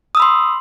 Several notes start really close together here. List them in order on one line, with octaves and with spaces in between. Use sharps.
D#6 E6 B5 C6